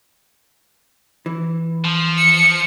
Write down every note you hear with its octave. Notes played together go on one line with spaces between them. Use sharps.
E3
F3
C#7